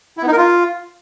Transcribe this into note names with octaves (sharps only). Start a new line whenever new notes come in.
E4
B3
D#4
A#4
F4